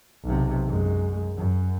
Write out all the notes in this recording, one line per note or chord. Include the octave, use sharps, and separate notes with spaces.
B1 C3
F#2 G#3
F#2